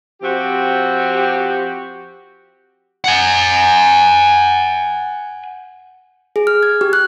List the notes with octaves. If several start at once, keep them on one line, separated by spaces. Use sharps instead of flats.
F3 C4 F#4 G4
F#5 G#5
G#4
F6
G#6
G4
F#6